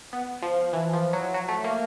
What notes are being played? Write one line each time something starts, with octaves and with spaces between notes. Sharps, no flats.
B3
F3
E3
F3
F#3
F#3
A3
A#3